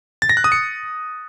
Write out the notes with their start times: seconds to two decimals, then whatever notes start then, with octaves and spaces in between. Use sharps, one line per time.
0.22 A6
0.29 A#6
0.37 F#6
0.44 D#6
0.52 C#7